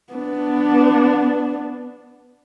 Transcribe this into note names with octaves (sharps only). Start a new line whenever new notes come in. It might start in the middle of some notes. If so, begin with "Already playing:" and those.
B3 D4